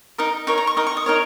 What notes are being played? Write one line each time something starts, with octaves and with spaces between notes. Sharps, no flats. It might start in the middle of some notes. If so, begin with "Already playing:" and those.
D#4 A#4 D#6
D#4 A#4 C#5 C#6
A#5
C#6
D#4 A#4 D#6
C#6
D#6
D#4 A#4 C#5